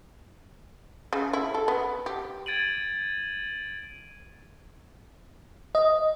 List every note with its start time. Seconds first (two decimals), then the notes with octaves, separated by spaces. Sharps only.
1.13 C#3
1.33 E4
1.54 A4
1.68 B3
2.06 G4
2.46 G#6 A6 D7 D#7 F#7
5.75 D#5